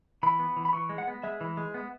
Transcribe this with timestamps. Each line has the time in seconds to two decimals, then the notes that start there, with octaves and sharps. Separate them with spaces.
0.23 E3 B5
0.39 B3
0.56 E3
0.65 B5
0.73 E3 C#6
0.89 G#3
0.98 F#5
1.07 B3
1.23 G#3 E5
1.41 E3
1.57 G#3
1.74 B3